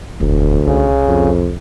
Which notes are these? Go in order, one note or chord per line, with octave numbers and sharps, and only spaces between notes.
E1 D2
C2 C#3
F2